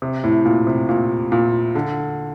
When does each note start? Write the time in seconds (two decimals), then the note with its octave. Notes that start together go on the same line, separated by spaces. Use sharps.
0.02 C3
0.24 A2
0.45 A#2
0.67 C3
0.89 A#2
1.32 A#2
1.75 D3